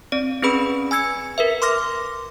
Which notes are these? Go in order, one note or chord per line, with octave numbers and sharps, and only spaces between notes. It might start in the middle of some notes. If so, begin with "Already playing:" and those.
C4 D5
C4 C#4 G#4 B4 B5
G#5 E6 G#6 C#7
A#4 B4 E5
C6 D6 F6 A#6